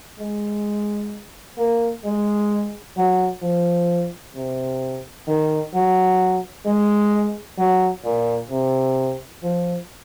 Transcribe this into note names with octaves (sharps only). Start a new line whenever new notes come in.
G#3
A#3
G#3
F#3
F3
C3
D#3
F#3
G#3
F#3
A#2
C3
F3